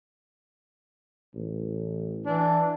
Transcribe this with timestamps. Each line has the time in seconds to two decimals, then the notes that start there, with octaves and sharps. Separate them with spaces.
1.35 A1
2.26 E3 D4